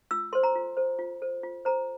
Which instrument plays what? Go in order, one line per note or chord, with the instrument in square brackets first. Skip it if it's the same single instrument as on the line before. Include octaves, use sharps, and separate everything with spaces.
[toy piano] F4 E6
A4 C5 C6
A#5
F4
A4 C5
F4
A4 C5
F4
A4 C5 A#5